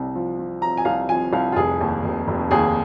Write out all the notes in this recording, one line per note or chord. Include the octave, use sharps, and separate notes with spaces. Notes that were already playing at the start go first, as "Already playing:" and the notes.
Already playing: C2 C3
F3
F3
F3 A#5
G#5
C2 F5
F3 G#5
C2 F5
F4
F1 G#4
D#2
F1
F1
D#2 G#4